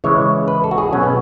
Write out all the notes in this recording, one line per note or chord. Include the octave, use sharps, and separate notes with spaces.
C#3 E3 G#3 C#5
B4
A4
F#4
G#4
B2 F#3 C#4
B3